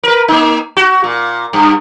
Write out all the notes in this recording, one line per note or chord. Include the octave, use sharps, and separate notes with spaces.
A#4 B4
A#3 D#4
F#4
A#2
G2